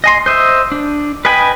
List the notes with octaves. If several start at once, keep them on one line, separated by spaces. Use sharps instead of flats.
D#5 G#5 C6
C5 D#5 E5
D4
B4 D#5 G5 G#5 B5